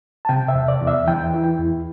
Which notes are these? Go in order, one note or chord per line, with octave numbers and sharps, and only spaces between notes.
A5
C3 G5
E5
E2
D5
E2
E5
E3 G5
E4
E2